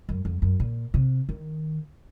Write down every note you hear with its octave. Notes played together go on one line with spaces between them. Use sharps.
F#2
F2
F#2
A#2
C3
D#3